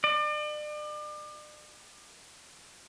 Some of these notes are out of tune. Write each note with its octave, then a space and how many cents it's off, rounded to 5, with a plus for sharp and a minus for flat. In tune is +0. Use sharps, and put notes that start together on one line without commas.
D5 +40